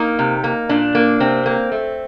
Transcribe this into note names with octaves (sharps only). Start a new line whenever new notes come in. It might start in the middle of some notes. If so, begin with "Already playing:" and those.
Already playing: A#3 D#4
C3
A#3
A#2 D4
A#3
C3 C4
A#3
A3